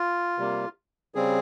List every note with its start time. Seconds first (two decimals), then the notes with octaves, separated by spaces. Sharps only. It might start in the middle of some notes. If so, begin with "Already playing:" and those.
Already playing: F4
0.38 C3 G3 A#3
1.15 C#3 G3 C4 G#4